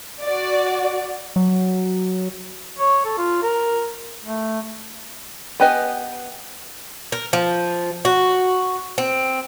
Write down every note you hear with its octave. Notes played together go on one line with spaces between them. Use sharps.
F#4 D5
F#3
C#5
A4
F4
A#4
A3
B3 G4 B4 D#5 G#5
A#4
F3
F#4
C4